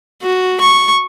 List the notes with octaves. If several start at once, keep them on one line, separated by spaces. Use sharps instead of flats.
F#4
C#6